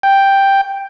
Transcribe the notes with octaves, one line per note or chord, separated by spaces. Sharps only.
G5